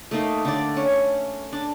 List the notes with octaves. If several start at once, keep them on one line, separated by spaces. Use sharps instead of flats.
A3 A#3 D#4
D3 D5
C#4 C#5
D4